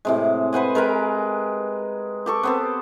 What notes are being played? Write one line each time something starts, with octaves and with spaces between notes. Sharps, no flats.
A2 C3 G#3
B4 C5 F#5 G#5
G#3 A#4 B4 G5
G4 A4 C#6
B3 C4 A4